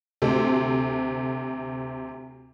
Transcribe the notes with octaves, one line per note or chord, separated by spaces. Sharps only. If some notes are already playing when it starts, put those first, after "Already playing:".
D2 C3 A4